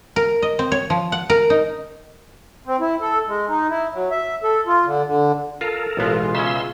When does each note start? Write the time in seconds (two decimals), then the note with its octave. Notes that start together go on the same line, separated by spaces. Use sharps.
0.16 A#4
0.42 D#5
0.59 C4
0.72 C#5
0.90 F3
1.12 F#5
1.30 A#4
1.50 D#4
2.66 C4
2.80 E4
3.01 A4
3.27 G#3
3.48 D#4
3.69 E4
3.93 F#3
4.11 E5
4.43 A4
4.67 F4
4.85 D3
5.04 D3
5.61 F4 A4 A#4
5.97 A1 B2 G#3 B3 F4
6.35 C#3 C#4 E5 C6 E6